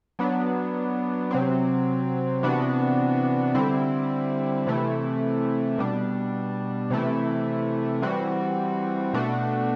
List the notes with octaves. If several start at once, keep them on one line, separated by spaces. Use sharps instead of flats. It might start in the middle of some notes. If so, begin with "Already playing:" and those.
F#3 B3 D4
C3 F#3 C4
C3 E3 B3 D4 F#4
D3 G3 C4 E4
C3 E3 A3 E4
B2 G3 D4
C3 E3 A3 E4
E3 G3 C4 F#4
B2 A3 D4 F#4